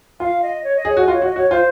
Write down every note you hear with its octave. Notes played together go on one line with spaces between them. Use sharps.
F4 F5
D#5
C#5
D#5
G#4 C#5
F#4 D#5
F4
C#5
F#4
D#5
F#4 C#5
F4 C5